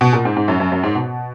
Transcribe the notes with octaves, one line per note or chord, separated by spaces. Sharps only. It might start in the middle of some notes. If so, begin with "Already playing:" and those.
B2
A#2
G#2
G#2
F#2
F#2
F#2
G#2
B2